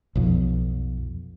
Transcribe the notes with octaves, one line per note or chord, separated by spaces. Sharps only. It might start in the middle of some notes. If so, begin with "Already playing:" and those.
B1 F2